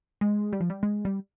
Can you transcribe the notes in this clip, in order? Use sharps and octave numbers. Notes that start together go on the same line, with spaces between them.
G#3
G3
F3
G3
G#3
G3